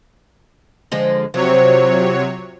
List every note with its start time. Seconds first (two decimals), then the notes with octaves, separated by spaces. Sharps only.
0.92 D3 F3 G#3
1.34 C3 F3 F#3 C#5